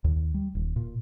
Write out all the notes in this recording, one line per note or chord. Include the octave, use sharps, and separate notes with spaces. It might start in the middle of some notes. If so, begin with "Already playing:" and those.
D#2
G3
D#1
A#2